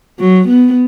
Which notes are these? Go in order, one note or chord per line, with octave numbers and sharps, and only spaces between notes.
F#3
B3